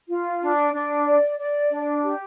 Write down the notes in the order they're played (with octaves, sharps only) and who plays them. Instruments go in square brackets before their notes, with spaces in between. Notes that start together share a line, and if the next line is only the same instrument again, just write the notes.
[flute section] F4
D4
D4
D5
D5
D4
G4